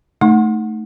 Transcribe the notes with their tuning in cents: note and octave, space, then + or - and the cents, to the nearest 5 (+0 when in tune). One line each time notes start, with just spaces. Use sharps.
A3 +0 D#4 +0 C6 +45